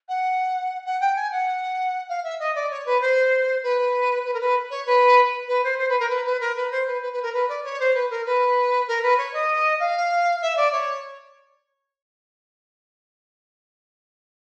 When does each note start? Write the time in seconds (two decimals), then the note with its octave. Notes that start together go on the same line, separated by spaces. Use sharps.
0.08 F#5
0.85 F#5
1.01 G5
1.16 G#5
1.32 F#5
2.09 F5
2.24 E5
2.39 D#5
2.55 D5
2.71 C#5
2.86 B4
3.01 C5
3.63 B4
4.25 B4
4.34 A#4
4.40 B4
4.70 C#5
4.86 B4
5.48 B4
5.64 C5
5.78 C5
5.89 B4
5.99 A#4
6.10 B4
6.25 B4
6.41 A#4
6.56 B4
6.71 C5
6.87 B4
7.02 B4
7.13 B4
7.22 A#4
7.33 B4
7.49 D5
7.64 C#5
7.80 C5
7.94 B4
8.10 A#4
8.26 B4
8.88 A#4
9.02 B4
9.18 C#5
9.33 D#5
9.80 F5
10.42 E5
10.56 D5
10.72 C#5